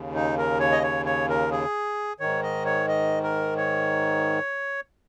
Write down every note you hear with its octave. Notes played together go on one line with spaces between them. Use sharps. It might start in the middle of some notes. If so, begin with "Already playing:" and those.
Already playing: D#2 C#3
D#4
A#4
C#5
D#5
C#5
C#5
A#4
G#4
G#2 D#3 C#5
D#5
C#5
D#5
A#4
C#5